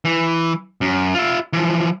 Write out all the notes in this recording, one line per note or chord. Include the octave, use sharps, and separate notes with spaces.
E3
F#2
F4 E5
E3 F3